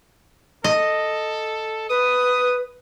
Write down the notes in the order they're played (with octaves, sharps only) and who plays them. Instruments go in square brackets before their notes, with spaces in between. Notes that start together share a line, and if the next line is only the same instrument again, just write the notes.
[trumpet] A4 [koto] D#5
[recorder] B4 [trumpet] D#6